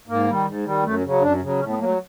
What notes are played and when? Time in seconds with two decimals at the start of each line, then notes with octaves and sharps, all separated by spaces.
0.08 G#2 A#3
0.27 D#3 G3
0.46 G#2
0.65 D#3 G3
0.84 F#2 A3
1.04 C#3 F#3
1.21 F#2 D4
1.42 C#3 F#3
1.59 A2 C#4
1.70 B3
1.79 F#3 A#3
1.88 A3